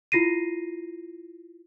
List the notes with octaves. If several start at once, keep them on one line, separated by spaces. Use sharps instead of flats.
E4 F4 A#6 C7 D#7